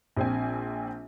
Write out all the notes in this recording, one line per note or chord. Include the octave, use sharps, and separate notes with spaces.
A#1 C4 G#5